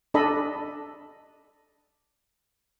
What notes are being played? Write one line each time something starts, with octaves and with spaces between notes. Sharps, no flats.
D4 A4 D#5 B5